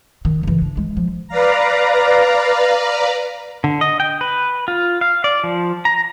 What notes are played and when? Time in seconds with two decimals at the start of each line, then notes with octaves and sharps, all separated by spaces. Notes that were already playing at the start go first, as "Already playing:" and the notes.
0.25 D#3
0.43 C#3 E3
0.62 D4
0.77 G#3
0.97 F3
1.28 B4 D5 F5 A#5
3.64 D3
3.81 D#5
4.00 G5
4.21 B4
4.68 F4
5.01 F5
5.24 D5
5.44 F3
5.85 A#5